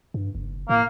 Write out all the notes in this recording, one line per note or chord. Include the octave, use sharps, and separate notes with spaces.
G2
F#1
A2 A#3